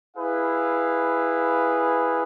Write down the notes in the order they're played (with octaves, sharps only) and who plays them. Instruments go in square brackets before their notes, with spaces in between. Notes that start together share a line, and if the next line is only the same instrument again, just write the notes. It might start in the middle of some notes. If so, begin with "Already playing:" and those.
[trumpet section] E4 G#4 B4 F5